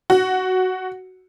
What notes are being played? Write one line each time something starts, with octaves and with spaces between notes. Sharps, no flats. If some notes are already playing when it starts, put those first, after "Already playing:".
F#4